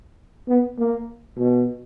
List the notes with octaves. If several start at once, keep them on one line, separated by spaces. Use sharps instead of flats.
B3
A#3
B2